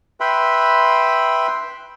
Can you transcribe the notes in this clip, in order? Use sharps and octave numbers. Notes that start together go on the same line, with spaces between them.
B4 E5 G5 B5 C6